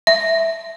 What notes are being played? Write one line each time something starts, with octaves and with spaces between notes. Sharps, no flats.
E5